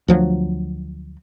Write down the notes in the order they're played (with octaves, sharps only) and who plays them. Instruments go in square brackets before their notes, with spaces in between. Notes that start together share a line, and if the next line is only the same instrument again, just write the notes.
[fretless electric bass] D2 F3 F#3